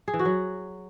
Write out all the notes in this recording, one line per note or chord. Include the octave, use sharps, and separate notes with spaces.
G#4
E3
F#4
F#3